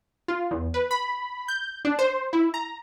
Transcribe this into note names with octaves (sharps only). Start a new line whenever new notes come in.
F4
E2
B4
B5
G6
D4
C5
E4
A#5